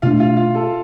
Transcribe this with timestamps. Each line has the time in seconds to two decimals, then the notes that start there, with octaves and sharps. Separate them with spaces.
0.02 B2 A3 D4 F4 F5
0.20 F4 F5
0.37 F4 F5
0.55 A4